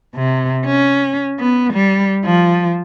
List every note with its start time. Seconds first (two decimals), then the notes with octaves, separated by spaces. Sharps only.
0.15 C3
0.65 C#4
1.39 B3
1.73 G3
2.25 F3